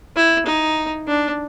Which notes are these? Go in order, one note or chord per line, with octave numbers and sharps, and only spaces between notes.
E4
D#4
D4